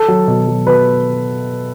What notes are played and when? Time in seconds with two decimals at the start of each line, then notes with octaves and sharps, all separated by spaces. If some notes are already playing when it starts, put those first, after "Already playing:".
Already playing: A4
0.08 F#3
0.27 B2
0.47 F#3
0.67 B2 B4